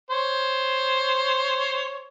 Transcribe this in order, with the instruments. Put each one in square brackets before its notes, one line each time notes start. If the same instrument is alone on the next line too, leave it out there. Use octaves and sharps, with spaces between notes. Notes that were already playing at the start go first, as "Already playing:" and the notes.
[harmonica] C5 C#5